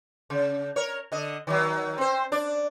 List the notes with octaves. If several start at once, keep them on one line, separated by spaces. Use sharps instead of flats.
C#3
A#4 C#5
D3 D#5
D#3 F3 F#3
C4 C5
D4 D5